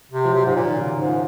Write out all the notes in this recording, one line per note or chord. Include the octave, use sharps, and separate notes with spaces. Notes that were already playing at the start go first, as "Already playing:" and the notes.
C3
F3
F#3
C3
G#2 F3
A#2
D#3
C#3
G#2
F3